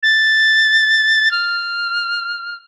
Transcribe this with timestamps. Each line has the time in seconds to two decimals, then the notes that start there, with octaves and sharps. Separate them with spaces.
0.03 A6
1.31 F6